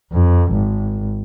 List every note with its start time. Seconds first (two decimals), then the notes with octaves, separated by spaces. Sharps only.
0.12 F2
0.52 G#1